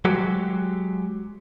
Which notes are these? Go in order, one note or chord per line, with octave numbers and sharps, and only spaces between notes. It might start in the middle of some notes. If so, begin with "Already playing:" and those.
F#3 G#3 F#4 G4